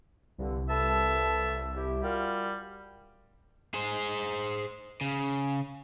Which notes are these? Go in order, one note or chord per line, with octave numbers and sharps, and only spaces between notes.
C2 G2 D3
A4 B4 E5 A5
E4 G4
G3 F4 F#4 A#4
G#4 C5
C#3